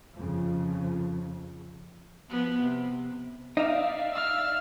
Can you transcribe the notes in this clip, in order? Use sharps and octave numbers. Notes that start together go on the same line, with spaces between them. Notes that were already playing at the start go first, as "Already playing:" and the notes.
F2 C#3 F3
F3 B3
C3
D#4 D5 E5 F5
E6 F6